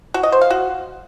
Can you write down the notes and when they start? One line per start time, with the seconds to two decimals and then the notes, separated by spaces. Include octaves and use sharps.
0.14 F#4
0.23 D#5
0.32 C5
0.41 F5
0.50 F#4